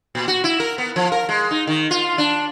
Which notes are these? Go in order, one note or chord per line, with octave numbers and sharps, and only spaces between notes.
A#2
F#4
E4
A#4
B3
F3
A#4
G#3
D#4
D#3
F4
D4